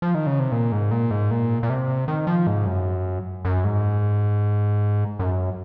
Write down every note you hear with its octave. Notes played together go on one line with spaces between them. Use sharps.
F3
D#3
C#3
C3
A#2
G#2
A#2
G#2
A#2
A#2
C3
D#3
F3
G#2
F#2
F#2
G#2
F#2